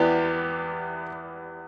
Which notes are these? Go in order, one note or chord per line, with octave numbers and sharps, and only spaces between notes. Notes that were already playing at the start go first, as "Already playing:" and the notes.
Already playing: E2 E3 B3 G4 D5